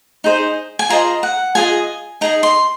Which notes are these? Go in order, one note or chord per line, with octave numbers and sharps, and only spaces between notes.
D#4 G#4 C5
G#5
F4 G#4 C5 D#5 A#5
F#5
F4 G#4 C5 D#5 G#5
D#4 G#4 D#5 A#5
C6